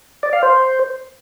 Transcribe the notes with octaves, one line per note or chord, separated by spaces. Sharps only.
D5
F5
C5